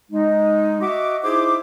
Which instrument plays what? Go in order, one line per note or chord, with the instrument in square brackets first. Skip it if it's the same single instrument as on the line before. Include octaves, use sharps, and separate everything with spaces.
[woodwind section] G#3 D#4
F#4 D#5 E5 F#5 D6
D#4 E4 G#4 C5 E5 D6